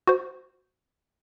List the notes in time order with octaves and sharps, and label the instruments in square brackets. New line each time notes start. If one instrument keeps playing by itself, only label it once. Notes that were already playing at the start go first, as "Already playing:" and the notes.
[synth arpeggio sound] F#4 C5